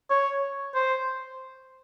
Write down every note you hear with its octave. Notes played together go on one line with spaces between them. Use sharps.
C#5
C5